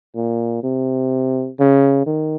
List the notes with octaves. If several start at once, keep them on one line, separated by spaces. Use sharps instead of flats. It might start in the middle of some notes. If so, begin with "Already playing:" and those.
A#2
C3
C#3
D#3